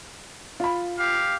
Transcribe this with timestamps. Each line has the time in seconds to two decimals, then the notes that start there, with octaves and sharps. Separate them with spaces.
0.60 F4 B5
0.99 G4 F5